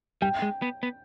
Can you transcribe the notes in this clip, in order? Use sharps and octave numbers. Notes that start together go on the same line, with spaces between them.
G3 G5
G#3
B3
B3